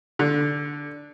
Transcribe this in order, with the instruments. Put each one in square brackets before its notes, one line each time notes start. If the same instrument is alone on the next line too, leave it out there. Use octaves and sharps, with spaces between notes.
[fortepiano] D3